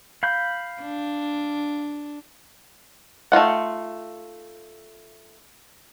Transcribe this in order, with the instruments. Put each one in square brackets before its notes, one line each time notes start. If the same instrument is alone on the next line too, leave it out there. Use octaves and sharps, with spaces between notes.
[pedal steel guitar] F5 B5 G6
[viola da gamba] D4
[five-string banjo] A3 D#4 F4 F#5